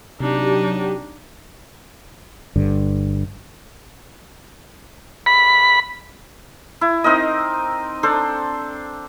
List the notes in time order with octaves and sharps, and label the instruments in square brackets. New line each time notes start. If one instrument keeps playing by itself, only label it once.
[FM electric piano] C3 [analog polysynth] F#3 G4 [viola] D4 D#4
[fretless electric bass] G1 G2 D3
[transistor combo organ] B5
[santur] E4
C4 D#4 A#4 D#5
D4 A4 C5